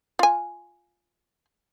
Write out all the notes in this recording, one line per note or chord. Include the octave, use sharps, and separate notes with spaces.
F4 G#5